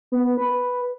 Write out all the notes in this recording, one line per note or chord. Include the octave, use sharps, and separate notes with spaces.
B3
B4